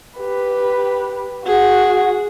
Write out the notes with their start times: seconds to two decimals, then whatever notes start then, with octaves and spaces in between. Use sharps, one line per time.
0.19 G4 B4
1.46 F#4 G#4